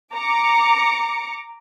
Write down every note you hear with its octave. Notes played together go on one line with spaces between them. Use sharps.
A#5 D6 C#7